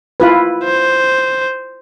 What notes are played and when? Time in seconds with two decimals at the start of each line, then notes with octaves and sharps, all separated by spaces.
0.20 E4 F4 B4
0.64 C5